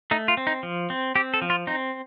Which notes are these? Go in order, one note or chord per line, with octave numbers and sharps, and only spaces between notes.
A3 D#4
F4
C4
D#4
F3
C4
C4 G4
A4
F3
F4
C4 D#4